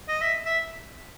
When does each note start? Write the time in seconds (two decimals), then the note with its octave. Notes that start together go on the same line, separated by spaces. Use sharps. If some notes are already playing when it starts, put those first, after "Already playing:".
0.08 D#5
0.21 E5
0.46 E5